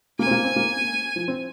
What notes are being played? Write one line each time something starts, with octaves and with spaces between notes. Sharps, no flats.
A#3 G#5
C4
A#3
C4
A#3
F3
C4